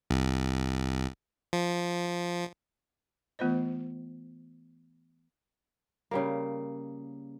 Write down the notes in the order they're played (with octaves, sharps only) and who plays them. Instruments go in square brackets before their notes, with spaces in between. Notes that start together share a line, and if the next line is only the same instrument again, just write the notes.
[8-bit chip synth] C2
F3
[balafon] E3 A3 B3 F4 C5 D#5
[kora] C#3 G3 A#3